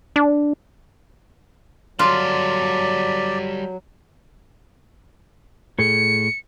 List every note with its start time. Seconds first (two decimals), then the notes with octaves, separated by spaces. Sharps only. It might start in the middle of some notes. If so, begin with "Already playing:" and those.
0.16 D4
1.99 F#3 G3 F4 A4 D5
5.79 A2 G#4 A4 C#7